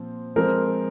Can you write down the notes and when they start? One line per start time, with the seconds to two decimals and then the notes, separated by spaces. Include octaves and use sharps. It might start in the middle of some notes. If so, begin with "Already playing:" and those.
Already playing: A#2 F3 C4
0.36 F3 G#3 C4 A#4